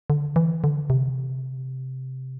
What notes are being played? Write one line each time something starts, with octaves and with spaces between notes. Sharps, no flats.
D3
E3
D3
C3